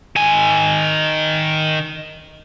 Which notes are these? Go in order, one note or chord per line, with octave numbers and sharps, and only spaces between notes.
D#3 G#5